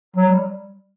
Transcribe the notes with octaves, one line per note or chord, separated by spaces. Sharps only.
F#3
G3